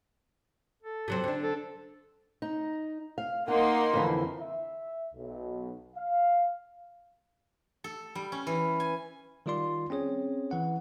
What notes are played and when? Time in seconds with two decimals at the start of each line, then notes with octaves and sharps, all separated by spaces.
0.83 A4
1.08 C3 F#3 C4
1.24 D3 D4
1.42 A4
2.42 D#4
3.18 F5
3.48 A#3 D#4 F#5 C6
3.93 F2 D3 E3
4.40 E5
5.14 B1
5.96 F5
7.84 A4
8.15 G3
8.32 C#4
8.47 E3
8.80 G#5
9.46 D#3 G3 F4 D5 C6
9.90 C4 C#4 G#4 C#5
10.51 E3 F#5